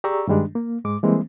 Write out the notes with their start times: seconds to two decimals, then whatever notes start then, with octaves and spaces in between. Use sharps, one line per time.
0.04 G4 G#4 D5 A#5 C#6 E6
0.28 G2 D#3 G3 G#3 D4
0.55 A#3
0.84 G#2 G#3 D6
1.03 E3 G3 G#3 A#3 C4